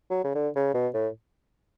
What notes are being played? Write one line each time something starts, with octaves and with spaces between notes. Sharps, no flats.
F#3
C#3
D3
C#3
B2
A2